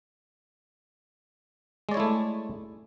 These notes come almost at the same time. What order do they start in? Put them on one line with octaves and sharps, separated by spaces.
G#3 D5 C#5 E4 A3